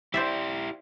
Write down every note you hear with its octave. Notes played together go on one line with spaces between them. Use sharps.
E4 G4 C5 D5 E5